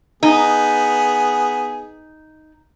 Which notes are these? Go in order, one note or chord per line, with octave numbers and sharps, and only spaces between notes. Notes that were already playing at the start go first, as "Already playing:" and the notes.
B3 D#4 G#4